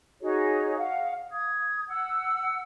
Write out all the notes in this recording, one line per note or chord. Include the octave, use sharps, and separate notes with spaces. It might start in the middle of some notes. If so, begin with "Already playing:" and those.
D#4 F#4 G#4 C#5
F5 F#5
D#6 G#6
F#5 E6